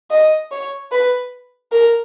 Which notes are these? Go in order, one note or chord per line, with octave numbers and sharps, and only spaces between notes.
D#5
C#5
B4
A#4